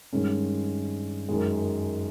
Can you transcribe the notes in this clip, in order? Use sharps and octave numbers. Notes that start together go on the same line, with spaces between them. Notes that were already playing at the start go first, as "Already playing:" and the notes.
G2 D#3 G#3 C#4
F#2 D#3 G#3